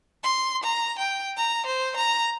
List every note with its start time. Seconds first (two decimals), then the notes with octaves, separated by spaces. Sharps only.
0.24 C6
0.63 A#5
0.99 G5
1.37 A#5
1.66 C5
1.97 A#5